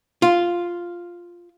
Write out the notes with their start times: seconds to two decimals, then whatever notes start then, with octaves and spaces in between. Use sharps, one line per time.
0.22 F4